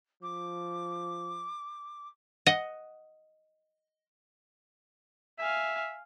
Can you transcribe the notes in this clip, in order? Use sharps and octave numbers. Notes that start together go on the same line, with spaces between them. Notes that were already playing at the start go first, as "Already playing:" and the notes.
F3 D6
D#5 F#5
E5 F5 G#5